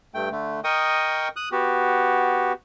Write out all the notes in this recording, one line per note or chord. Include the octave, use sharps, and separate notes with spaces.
G2 A3 G5
D3 A3
A#4 D#5 G5 C#6 D#6
D#6 F#6
B3 F#4 G4